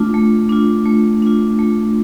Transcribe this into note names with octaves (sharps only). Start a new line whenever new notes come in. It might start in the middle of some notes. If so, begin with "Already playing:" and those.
Already playing: A3 D4 F4
A3
D4 F4
A3
D4 F4
A3